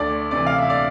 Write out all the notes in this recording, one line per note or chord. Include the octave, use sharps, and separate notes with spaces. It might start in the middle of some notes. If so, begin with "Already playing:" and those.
Already playing: D2 D5
C3 E3 D5
F5
E5
D5